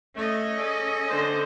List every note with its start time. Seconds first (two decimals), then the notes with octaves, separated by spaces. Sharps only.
0.16 A3 C#4 D#5
0.56 G#4 A4 D5
1.08 D3 C5